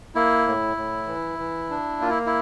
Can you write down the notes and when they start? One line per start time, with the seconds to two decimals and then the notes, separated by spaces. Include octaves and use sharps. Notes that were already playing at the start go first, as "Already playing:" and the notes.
0.15 A#3 E4
0.47 A2
0.77 A2
1.07 E3
1.39 E3
1.70 D4
2.01 A#3 F4
2.10 E4
2.26 E4